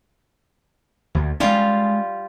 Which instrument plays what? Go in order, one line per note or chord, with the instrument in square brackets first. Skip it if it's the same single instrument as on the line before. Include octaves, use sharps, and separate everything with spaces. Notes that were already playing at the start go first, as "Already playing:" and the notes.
[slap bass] D2
[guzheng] G3 F4 F5 [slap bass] G#3 C#4